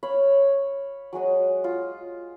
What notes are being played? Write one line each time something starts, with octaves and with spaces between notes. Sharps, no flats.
C#5 F5 B5
F#3 G#3 F#4 D#5
F4